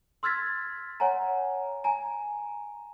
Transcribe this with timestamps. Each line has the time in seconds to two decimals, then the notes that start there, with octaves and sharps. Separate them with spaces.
0.23 C6 E6 F6 G#6 A6 B6
1.00 C#5 F#5 G#5 A#5
1.84 G#5 A#5